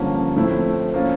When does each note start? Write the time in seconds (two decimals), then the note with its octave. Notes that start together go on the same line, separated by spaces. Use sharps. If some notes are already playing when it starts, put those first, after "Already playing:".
Already playing: G2 D3 F3 A#3 C#4
0.36 A2 F3 A3 C4 E4
0.94 F3 A#3 C#4 F4